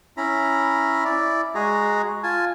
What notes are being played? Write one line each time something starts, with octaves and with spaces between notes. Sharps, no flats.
C#4 E4 A#5 B5
E4 D5
G#3 F#4 G#4 A#5
F4 G#5 A5